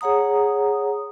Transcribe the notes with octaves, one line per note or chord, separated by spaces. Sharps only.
G#4 C#5 F#5 A#5 D#6